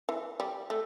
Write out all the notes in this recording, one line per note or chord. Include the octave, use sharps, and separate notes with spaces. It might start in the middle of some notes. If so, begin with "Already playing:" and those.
E3
G3
A3